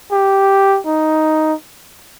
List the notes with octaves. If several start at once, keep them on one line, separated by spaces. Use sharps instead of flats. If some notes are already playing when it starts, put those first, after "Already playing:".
G4
D#4